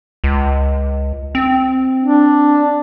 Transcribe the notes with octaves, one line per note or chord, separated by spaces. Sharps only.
C#2
C4
D4